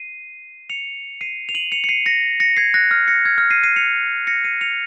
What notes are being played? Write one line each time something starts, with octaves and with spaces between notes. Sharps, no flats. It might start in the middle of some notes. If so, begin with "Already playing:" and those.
Already playing: C7 D#7
C#7 F7
C7 D#7
F7
D#7 F#7
C#7 F7
C#7
C7 D#7
A#6 C#7
A#6 C#7
G#6 C7
F#6 A#6
F6
A#6 C#7
F6 G#6
F6
C7 D#7
C7 D#7
C#7 F7
A#6 C#7
C7 D#7
C#7 F7